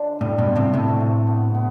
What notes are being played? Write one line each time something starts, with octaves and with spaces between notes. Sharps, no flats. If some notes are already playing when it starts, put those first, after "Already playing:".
Already playing: D3 D4 F4
A2 G3
G2 B2
F4
A2 C3
A2 C3 A3
A3
B3
B3